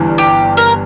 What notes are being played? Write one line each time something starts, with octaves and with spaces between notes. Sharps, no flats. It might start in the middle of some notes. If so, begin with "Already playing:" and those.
Already playing: G1 G2 E3
G4
A#4